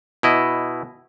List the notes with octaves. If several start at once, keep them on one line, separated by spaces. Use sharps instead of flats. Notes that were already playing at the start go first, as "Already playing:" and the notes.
B2 E4 D#5